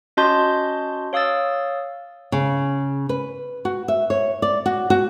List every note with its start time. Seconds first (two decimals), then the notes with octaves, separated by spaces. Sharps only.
0.17 C#4 F#4 D#5 A5 C6 G6
1.13 C#5 F5 D#6 E6 A6
2.32 C#3
3.09 B4
3.65 F#4
3.88 E5
4.10 C#5
4.42 D5
4.66 F#4
4.90 F#4